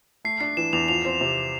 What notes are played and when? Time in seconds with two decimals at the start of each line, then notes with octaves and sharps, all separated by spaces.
0.25 A3 C7
0.40 D4 C7
0.57 E3 E7
0.73 E2 F7
0.88 F3 F7
1.05 C4
1.21 C3